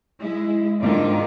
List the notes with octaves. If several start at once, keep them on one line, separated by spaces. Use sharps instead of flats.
G#3 E4
G#2 D3 D#3 F4